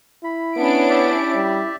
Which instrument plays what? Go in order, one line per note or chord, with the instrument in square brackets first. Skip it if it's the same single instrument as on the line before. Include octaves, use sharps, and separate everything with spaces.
[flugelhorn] E4 [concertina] B5
[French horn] B3 [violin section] C#4 D4 D7
[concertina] G4 D5 E5
[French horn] G3